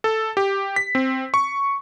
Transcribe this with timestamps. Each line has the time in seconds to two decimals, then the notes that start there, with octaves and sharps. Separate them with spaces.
0.04 A4
0.37 G4
0.76 B6
0.95 C4
1.34 C#6